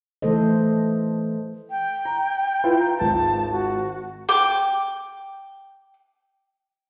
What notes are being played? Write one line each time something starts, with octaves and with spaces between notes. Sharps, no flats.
E3 A3 A4 C5 D#5
G5
A#5
E4 F4 B4
A#5
G#1 F4 A5
F#4
G5 D6